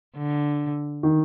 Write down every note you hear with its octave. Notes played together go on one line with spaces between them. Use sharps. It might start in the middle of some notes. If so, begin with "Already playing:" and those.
D3
D#3